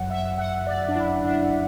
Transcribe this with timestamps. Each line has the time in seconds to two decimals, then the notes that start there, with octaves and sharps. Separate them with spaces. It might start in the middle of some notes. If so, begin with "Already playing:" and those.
Already playing: G1 F#2 F#3 F#5
0.10 E5
0.38 F#5
0.67 D5
0.88 D4
0.95 E4
1.24 D4